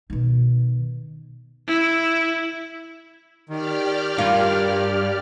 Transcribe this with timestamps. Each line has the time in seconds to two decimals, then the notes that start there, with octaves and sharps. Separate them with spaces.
0.10 B2 D#3
1.67 E4
3.49 D#3 G4 D5 F6
4.18 G2 F4 A#4